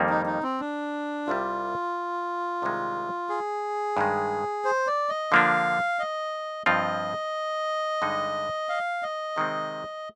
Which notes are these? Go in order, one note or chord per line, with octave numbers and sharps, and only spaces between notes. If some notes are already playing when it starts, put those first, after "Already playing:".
Already playing: F2 D#3 G3 A#3
D#4
D#4
C4
D4
C2 C3 G3 F4
C2 C3 D#3 G#3
G#4
G2 D#3 G#3
C5
D5
D#5
D3 F3 A#3 D4 F5
D#5
G2 F3 C4 F4 D#5
G2 D3 G#3 D#4
F5
D#5
C3 D#3 G#3 C4